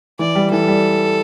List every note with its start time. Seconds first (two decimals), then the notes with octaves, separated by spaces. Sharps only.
0.19 E3 D5
0.35 G3
0.51 E3 A4
0.68 G3